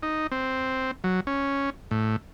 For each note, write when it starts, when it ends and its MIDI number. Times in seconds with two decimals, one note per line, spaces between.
0.03 0.27 63
0.32 0.91 60
1.04 1.20 54
1.27 1.70 61
1.91 2.16 45